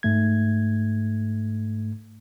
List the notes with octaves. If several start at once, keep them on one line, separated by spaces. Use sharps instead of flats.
G#2 A3 G#6